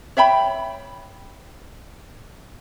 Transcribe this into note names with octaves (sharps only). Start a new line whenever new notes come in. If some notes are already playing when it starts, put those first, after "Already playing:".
C#5 E5 G5 B5